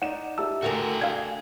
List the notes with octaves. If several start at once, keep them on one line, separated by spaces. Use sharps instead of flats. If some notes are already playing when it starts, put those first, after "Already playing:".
D#4 D5 F#5 E7
G4 E5 A5 E6
D3 A3 F#4 G#4 A#4 G5 F7
D4 F5 G#6